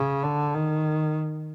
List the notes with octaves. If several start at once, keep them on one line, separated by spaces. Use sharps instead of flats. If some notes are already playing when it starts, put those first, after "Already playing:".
Already playing: C#3
D3
D#3